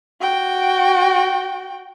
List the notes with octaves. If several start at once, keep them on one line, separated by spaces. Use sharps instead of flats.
F#4 G5